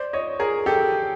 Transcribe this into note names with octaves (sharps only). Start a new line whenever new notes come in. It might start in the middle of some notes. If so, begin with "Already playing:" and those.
Already playing: C5 D5
C#5 D#5
G#4 A#4
G4 A4